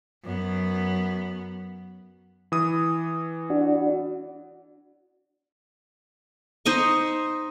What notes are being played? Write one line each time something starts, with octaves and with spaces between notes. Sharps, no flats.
F#2 B3
E3 D#6
D4 F#4
D#4 C5 D#5 C#6